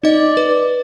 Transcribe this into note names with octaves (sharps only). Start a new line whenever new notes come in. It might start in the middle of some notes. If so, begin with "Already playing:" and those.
D#4 D5 D#5
B4